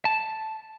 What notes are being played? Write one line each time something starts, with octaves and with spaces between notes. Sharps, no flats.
A5